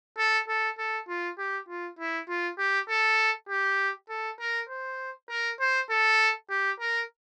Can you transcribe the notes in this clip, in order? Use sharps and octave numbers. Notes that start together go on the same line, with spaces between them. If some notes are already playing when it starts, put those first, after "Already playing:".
A4
A4
A4
F4
G4
F4
E4
F4
G4
A4
G4
A4
A#4
C5
A#4
C5
A4
G4
A#4